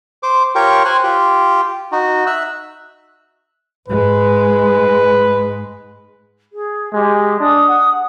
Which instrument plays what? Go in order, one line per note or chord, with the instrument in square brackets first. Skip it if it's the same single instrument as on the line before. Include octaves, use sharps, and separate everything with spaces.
[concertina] C5 D6
F4 G4 A#4 C#5 G5 C#6
C5 G#5 C#6 F#6
F4 G4
D#4 F#4
E5 E6 F#6
[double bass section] G#2 G#3 [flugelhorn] B4
[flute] G#4
[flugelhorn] G#3 [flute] G4
[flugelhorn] D4 [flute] D#6
[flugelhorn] F#5